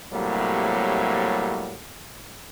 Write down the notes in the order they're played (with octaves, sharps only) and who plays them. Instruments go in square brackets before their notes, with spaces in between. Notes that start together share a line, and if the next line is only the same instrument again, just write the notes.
[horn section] A2 C3 F#3 G3 A#3